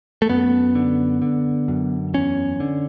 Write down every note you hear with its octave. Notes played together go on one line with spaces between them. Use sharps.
A3
F#2 B3
D3
D3
F#2
E2 C#4
D3